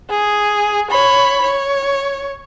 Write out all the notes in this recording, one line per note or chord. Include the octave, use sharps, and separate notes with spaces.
G#4
C#5 B5
C#5